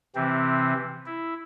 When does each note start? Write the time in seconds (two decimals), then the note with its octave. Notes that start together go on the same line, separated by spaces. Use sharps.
0.15 C3 E3 C4
1.06 E4